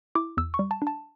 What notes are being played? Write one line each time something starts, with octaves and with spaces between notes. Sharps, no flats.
E4 D6
E2 E6
C#6
G3
A5
D4
A5